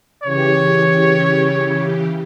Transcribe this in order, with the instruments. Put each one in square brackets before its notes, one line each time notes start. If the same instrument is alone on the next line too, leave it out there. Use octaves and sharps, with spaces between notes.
[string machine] C#3 E3 G4 [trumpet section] C#5